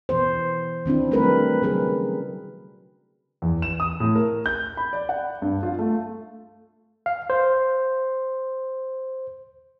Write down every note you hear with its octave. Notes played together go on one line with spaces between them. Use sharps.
B2 E3 B3 C5
D#3 C4 D4 E4
F#3 G3 A3 D4 A#4 B4
C#3 F#3 G#4 A#4 B4
E2
E7
D#6
A2
A#4
G6
B5
D5
F#5
G2
F4
A3
F5
C5